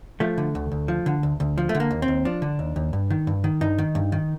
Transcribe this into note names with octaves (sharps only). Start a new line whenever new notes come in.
F3 A3
D3
D2
D2
F3
D3
D2
D2
F3
A3
D3
A#3
D#2
C4
D#2
F3 D4
D3
D#2
D#2
G2
D#3
G2
D#3
G2 D#4
D#3
G2
D#3